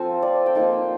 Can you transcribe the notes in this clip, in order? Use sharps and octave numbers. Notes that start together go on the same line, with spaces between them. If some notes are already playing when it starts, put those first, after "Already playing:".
Already playing: F3 C4 F4 A4 C5
D5
G5
F3 A#3 D#4 A5